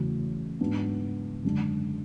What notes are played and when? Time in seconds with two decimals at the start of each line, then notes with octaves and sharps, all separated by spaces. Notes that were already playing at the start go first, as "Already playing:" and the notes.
Already playing: E2 C#3 F#3 A3
0.60 G#2 F#3 B3 D4
1.44 F#2 D3 G#3 D4